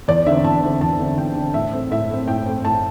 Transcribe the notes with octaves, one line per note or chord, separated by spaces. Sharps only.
E2 D5
D3 C4 E5
E2 A5
D3 C4
E2 A5
D3 C4
E2 G5
D3 C4
A2 E5
A3 C4
A2 E5
A3 C4
A2 G5
A3 C4
A2 A5